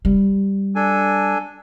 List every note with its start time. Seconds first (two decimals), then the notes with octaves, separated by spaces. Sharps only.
0.05 G3
0.75 D4 A4 G#5